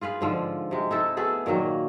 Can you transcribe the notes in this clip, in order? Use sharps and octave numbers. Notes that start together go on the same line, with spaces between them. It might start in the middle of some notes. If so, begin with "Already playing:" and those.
F4 G#4 B4 F5
G#2 D3 F3
C3 G#3
D#4 E4 A4
A3 B3 G#4 A4
A#2 D#3 F#3 A#3